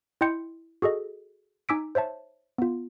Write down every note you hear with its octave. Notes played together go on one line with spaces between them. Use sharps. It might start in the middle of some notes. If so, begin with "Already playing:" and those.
E4 D#5 G5 C6 G6 C#7
F#4 G#4 A4 D#5
D#4 G#5 D6 E6 B6 D7
C5 C#5 E5 A5
B3 F4